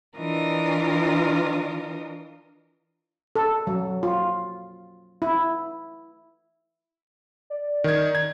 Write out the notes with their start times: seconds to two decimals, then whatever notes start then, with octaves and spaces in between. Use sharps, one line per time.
0.18 E3 D4 F4 A#4 D#5
3.36 A4
3.67 F#3
4.03 F4
5.22 E4
7.50 D5
7.84 D#3 G#6
8.15 G#6